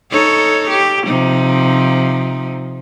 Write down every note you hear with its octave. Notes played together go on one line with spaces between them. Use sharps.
D#4 A4 C#5
G4
C3 F3 D#4